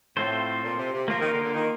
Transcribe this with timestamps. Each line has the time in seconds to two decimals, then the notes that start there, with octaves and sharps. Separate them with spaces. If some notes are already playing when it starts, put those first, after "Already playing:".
0.17 A2 C4 F4 A4 C5
0.63 A#2
0.78 C3
0.94 C3
1.08 F3 A#3 F4 A#4
1.20 D#3
1.31 D3
1.43 D3
1.53 D#3